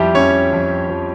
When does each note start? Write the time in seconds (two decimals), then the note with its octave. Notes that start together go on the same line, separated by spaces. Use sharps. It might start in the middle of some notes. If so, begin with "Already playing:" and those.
Already playing: F2 F3 G3 E4 G4
0.15 F2 C#4 C#5
0.53 F2
0.89 F3